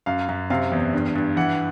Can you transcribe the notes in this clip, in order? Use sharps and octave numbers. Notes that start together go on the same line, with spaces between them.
F#2 F5
F#2
C3 F5
E2
G2
G2
E3 F#5